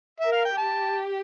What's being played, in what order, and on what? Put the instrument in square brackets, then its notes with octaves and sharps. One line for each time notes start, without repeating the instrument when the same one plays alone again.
[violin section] A#4 [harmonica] E5
[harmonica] F5
G5
[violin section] G4 [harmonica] A5